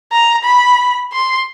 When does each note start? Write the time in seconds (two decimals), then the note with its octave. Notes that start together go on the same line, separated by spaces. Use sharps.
0.12 A#5
0.45 B5
1.12 C6